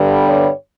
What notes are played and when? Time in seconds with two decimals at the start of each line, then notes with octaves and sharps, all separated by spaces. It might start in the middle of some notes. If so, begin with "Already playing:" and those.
Already playing: G2 D3 G3 B3
0.26 C#5